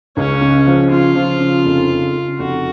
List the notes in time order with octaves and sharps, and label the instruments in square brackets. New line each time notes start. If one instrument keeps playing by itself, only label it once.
[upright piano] C#2 [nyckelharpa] C#4
[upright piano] C#3
F3
[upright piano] C#3 [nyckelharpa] F4
[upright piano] F3
C#3
F1
C#3
C#3
[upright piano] F1 [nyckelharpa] F#4